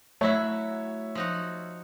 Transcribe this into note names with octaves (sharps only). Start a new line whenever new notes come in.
F#3 A3 E4 F#4 C#5 E5
F3 D#4 F#4